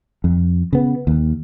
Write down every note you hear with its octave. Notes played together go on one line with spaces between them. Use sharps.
F2
C#3 B3
D#2